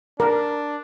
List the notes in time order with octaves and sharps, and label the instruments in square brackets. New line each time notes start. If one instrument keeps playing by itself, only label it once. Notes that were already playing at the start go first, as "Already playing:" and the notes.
[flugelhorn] D4 [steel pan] A#4